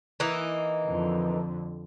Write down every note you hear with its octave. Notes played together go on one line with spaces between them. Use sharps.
E3 A#3 D#4
F2 D3